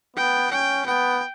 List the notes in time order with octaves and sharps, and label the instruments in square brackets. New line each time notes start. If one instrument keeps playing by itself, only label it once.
[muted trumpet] B3 [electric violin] G5
[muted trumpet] C#4 [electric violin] G5
[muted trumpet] B3 [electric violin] G5